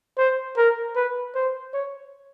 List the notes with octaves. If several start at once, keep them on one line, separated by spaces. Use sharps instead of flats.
C5
A#4
B4
C5
C#5